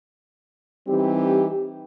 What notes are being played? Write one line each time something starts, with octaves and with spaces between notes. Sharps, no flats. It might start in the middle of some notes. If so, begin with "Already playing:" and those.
E3 G3 C4 D#4 G4